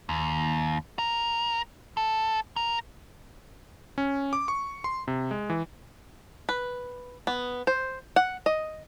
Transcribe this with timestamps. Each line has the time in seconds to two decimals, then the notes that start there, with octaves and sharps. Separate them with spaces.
0.09 D#2
0.99 A#4
1.97 A4
2.56 A#4
3.98 C#4
4.33 D6
4.48 C#6
4.84 C6
5.08 C3
5.31 G#3
5.50 E3
6.49 B4
7.27 B3
7.67 C5
8.16 F#5
8.46 D#5